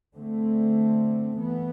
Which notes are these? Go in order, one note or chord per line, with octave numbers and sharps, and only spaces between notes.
D3 A3 C4
E3 B3